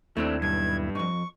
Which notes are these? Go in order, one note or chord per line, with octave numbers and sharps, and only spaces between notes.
D#2 A3 C4 D4 E4
B1 G2 G#6
F2 G#2 C#6